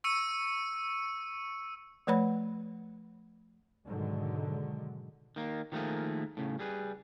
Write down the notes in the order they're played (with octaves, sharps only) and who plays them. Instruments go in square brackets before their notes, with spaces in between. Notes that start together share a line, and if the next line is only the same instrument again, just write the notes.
[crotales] C#6 E6 C#7 D#7
[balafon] F3 A3 B4 C#5 F#5 B5
[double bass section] G#2 B2 D3 D#3 F#3 G#3
[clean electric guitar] D#3 A#3
D#3 F3 A3 A#3 G#4
A2 C#3
G3 G#4 B4